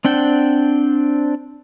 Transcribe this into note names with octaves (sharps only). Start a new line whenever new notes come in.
C4 D4 F#5 G5